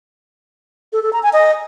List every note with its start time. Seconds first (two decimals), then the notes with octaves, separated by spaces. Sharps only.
0.93 A4
1.03 A4
1.13 A#5
1.23 G#5
1.33 D#5